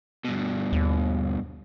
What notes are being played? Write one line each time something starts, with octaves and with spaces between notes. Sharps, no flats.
G2 B2
D#2